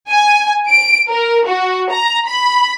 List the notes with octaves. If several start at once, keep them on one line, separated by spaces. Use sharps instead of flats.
G#5
D7
A#4
F#4
A#5
B5